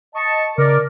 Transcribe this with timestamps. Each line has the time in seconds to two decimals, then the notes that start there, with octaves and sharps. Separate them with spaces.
0.15 D#5 A5 C#6
0.58 C#3 A#4 D5